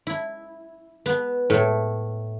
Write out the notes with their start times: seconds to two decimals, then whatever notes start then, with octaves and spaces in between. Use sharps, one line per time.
0.07 E4
1.06 B3
1.50 A2